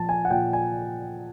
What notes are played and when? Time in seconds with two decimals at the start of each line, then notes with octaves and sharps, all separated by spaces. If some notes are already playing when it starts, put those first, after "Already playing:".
Already playing: A#2 F3 A5
0.09 G#5
0.25 F#5
0.31 A#2 G5
0.53 G#5